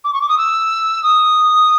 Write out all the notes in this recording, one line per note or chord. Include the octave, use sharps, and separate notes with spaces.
D6
C#6
D6
D#6
E6
D#6